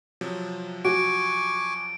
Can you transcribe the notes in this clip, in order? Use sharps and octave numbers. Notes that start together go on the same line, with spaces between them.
C3 F3 F#3
F#4 G#5 C#6 D6 D7